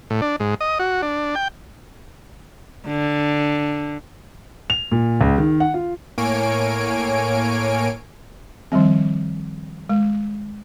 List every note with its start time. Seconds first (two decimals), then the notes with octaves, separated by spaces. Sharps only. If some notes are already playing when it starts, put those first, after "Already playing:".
0.10 A2
0.22 D4
0.40 G#2
0.61 D#5
0.79 F#4
1.02 D4
1.35 G5
2.87 D3
4.70 F7
4.92 A#2
5.21 C#2
5.38 D#3
5.60 F#5
5.74 F4
6.18 A2 A#3 C#5 G#5 D7
8.72 D#3 F3 G3 C4
9.89 G#3